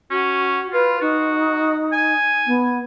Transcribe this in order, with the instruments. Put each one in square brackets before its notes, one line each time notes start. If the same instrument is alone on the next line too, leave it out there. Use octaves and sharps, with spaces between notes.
[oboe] C#4 [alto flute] F#4
[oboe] F4 [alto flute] B4
[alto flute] D#4 [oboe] F#4
[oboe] G#5
[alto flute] B3